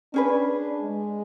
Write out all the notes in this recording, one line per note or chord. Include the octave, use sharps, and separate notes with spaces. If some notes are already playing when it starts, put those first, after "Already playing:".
C#4 D4 G#4 B4
G#3